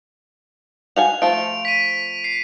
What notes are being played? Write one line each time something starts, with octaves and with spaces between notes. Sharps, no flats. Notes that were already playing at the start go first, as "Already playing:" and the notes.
F#4 F5 G#5 F7
F3 A3 F4 D7
B6 D#7
C7